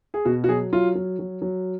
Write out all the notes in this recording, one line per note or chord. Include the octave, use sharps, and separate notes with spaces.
G#4
B2 F#4
F#4
F#3 G#4
F#3 F4
F#3
F#3
F#3